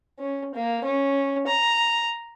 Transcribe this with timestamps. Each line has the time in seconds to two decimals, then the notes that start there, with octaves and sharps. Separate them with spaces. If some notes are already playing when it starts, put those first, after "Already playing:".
0.19 C#4
0.55 A#3
0.84 C#4
1.47 A#5